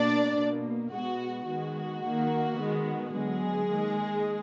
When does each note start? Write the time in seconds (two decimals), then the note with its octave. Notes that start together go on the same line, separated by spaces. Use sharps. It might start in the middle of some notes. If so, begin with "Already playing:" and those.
Already playing: B2 A#3 D4 D5
0.38 B2 A#3
0.93 B2 G#3 B3 F#4
1.47 D#3 G#3 B3 F#4
2.02 D#3 A#3
2.58 D#3 G#3 B3
3.11 D3 F#3 G#3 B3 G#4
3.67 D#3 A#3